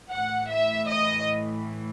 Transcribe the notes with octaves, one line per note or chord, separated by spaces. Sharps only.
A2 E3 F#5
E5
D#5